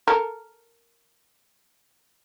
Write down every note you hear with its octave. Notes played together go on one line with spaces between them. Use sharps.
A4 A#4